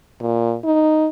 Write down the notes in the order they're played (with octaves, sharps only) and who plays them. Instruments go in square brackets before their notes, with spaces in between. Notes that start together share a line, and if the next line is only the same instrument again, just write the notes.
[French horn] A#2
D#4